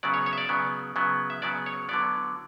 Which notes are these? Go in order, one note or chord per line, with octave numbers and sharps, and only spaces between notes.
C#3 F#3 B3 D5
C#5
C#5
E5
D5
C#3 F#3 B3
C#3 F#3 B3
E5
C#3 F#3 B3 D5
C#5
D3 F#3 B3 D5